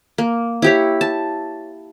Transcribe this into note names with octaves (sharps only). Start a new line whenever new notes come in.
A#3
E4 G4 C#5
A5